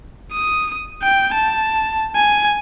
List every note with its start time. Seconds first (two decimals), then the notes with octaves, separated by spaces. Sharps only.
0.32 D#6
1.03 G5
1.34 A5
2.16 G#5